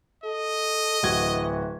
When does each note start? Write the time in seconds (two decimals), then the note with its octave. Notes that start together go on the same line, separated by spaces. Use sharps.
0.24 A4 D#5
1.03 D1 E3 F#4 G#6